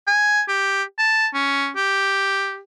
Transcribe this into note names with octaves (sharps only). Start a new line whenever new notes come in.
G#5
G4
A5
C#4
G4